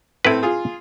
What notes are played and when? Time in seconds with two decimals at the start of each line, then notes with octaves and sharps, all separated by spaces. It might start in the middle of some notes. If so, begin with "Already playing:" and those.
0.25 A2 C4 E4 A4 B4
0.43 F4 G#4